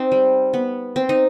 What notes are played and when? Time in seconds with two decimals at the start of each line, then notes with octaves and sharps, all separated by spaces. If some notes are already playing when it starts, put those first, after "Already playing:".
Already playing: C4 D#4
0.12 G3
0.54 B3
0.96 C4
1.09 D#4